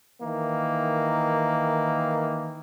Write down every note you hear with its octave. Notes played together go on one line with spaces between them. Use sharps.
D#3 E3 A#3